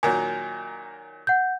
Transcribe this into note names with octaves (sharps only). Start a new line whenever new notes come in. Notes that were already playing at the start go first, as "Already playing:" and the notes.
A#2 D#3 F#3 G#5
F#5 G6